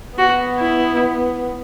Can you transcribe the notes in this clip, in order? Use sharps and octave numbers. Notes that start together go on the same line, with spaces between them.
B3 F#4
E4